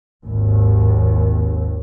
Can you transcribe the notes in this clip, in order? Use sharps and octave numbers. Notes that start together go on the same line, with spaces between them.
G#1 D#2